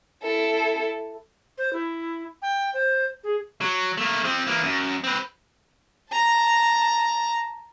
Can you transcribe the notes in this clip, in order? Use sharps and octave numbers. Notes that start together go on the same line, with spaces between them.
E4 A4
C5
E4
G5
C5
G#4
F#3
A3 A#3
F3 C4
E3 A#3
F#2
C4 B4
A5 A#5